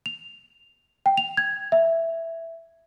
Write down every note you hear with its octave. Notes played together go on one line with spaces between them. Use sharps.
F7
G5
F7
G#6
E5